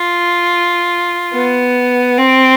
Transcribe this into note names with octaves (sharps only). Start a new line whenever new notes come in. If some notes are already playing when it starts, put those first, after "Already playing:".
Already playing: F4
B3
C4